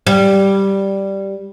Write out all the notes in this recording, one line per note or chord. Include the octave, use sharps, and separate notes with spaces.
G3